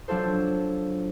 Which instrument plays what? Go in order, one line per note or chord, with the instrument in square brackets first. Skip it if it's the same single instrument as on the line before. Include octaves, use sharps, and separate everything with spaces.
[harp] F#3 D4 F4 A4 C5